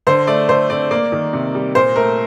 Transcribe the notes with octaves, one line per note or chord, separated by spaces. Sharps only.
D3 C5
A3 D5
D3 C5
C4 D5
A#3 D5
D#3
C3
G3
A#2 C5
A3 A#4